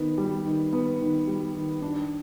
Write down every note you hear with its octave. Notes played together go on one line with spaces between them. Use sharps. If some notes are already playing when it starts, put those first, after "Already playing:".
Already playing: D#3 B3
G3
D#3
B3
D#3
G3
D#3
D4